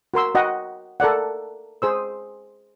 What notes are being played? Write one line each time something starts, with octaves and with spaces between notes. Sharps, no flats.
F#4 A#4 C6 E6
F#4 D#5 F#5 G5
A4 A#4 D5 F#5
G#4 C5 E6